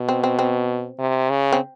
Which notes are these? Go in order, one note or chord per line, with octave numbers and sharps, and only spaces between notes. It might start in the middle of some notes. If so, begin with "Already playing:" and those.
Already playing: B2
C4
C4
C4
C3
C#3
C4